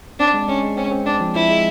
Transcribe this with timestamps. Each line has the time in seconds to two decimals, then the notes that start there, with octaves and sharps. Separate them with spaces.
0.19 C4 D4
0.34 G#3
0.48 G#3 C#4
0.63 G#3
0.77 C4 C#4
0.92 C4
1.06 C4 D4
1.21 F3
1.35 F3 E4
1.50 G#3